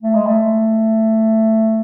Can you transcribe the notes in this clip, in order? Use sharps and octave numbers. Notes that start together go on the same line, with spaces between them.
A3
G#3
A3